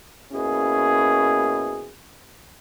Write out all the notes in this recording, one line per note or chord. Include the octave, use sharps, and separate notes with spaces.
B2 A#3 C#4 E4 G#4